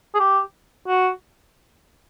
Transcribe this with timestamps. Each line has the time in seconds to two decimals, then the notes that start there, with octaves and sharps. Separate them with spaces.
0.14 G#4
0.19 G4
0.88 F#4